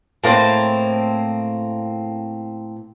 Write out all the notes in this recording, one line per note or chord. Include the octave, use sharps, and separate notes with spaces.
A2 A#3 C4 C5